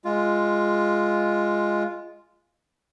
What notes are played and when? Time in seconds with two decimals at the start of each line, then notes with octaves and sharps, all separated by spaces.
0.05 G#3 F4